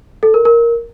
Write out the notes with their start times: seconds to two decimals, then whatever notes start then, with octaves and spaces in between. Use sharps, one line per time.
0.23 A4
0.34 A#4
0.45 A#4